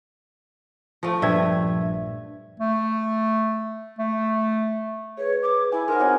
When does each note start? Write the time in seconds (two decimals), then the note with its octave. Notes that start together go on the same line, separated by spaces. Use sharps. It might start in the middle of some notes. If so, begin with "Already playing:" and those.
1.03 F3 A3
1.22 A#1 G2 E5 G#6
2.59 A3
3.99 A3
5.18 G#4 B4 C#5
5.43 D6
5.72 E4 G#5
5.88 G#3 D#4 A#4 C5 F#5
5.99 F#3 C4 D#4 F#5 G#5